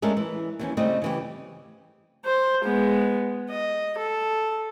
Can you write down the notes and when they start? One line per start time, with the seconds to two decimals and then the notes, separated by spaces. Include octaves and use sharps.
0.02 G#3 A3 C#4 D4 A4 A#4
0.17 E3
0.59 D#2 E3 C#4
0.77 C#3 G3 A3 C4 D#5
1.02 C#3 E3 G4
2.25 C5
2.64 G#3 B3
3.50 D#5
3.98 A4